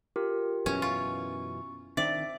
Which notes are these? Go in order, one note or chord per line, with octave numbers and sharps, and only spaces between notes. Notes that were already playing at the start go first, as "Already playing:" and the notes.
F4 G4 A#4
F#2 B2 E3 C#4
F4 C#6
D#3 C4 D4 D5 E5